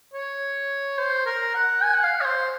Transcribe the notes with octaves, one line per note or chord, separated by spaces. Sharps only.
C#5
C5
A#4
F#5
G#5
F#5
F5
C#5
C5